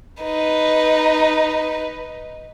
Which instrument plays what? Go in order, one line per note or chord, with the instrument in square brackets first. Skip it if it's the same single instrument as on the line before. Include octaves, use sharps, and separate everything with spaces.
[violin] D#4 B4